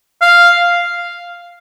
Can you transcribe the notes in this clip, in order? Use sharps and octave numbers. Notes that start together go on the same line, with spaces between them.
F5